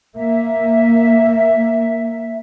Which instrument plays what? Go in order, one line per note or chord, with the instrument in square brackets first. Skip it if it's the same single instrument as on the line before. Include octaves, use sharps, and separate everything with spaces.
[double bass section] A#3 [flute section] E5